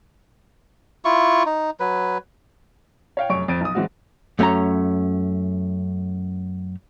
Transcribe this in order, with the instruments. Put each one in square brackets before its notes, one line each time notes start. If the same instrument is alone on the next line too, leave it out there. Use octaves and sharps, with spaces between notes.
[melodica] E4 F4 C#6
D#4
F#3 B4
[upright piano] C#5 F5 G5
F1 F#2 C#5 C#6 D7
F2 C4 A6 D7 D#7
B1 D#6
E3 F#3 G#3 C4 F#4
[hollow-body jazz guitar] F#2 A3 C#4 C#5 A#5